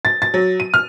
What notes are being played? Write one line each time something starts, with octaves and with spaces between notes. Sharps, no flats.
A6
A6
F#3
D#7
F6